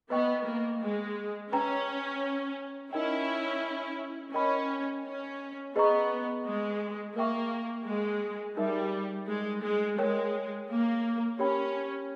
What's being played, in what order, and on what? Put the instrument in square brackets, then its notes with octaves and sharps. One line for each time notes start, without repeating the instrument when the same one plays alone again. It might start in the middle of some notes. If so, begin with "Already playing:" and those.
[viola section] B3 [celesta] B4 D#5 G5 C#6
[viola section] A#3
G#3
[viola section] C#4 [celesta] B4 G5 A#5
[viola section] C#4 E4 [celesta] D#4 A#4 D#5 G5
[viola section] C#4 [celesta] A#4 D#5 G5 B5
[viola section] C#4
[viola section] B3 [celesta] G#4 B4 D#5 A#5 C#6
[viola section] G#3
[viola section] A#3 [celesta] A#4 E5 G5 C#6
[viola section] G#3
[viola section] G3 [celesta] D#4 A#4 E5
[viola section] G#3
G#3
[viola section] G#3 [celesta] A#4 C#5 G5
[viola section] A#3
[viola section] C#4 [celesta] G4 A#4 C#5 G5 B5